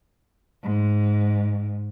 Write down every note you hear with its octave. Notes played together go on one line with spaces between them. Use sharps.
G#2